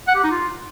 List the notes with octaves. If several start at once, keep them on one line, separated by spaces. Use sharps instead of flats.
F#5
G4
D#4
F4